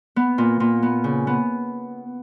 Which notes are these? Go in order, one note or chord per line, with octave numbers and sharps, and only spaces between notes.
B3
A#2
A#2
B3
C#3
B3